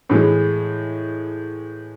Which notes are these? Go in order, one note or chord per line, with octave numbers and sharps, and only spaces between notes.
A2 E3 G#3